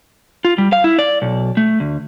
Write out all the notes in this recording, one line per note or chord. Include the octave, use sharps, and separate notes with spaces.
F4
G3
F5
E4
D5
B1
A3
D2